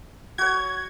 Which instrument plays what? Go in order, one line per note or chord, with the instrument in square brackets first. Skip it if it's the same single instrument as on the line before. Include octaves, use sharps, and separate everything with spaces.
[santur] F#4 C#5 [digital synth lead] G#6